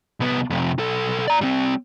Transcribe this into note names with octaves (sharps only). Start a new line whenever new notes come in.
C2 B3
F2 C3
B1 A4
D5 A#5
G3 C4